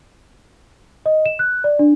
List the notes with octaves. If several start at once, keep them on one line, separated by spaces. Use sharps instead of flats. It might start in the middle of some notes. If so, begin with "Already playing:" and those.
D#5
E7
F#6
D5
D4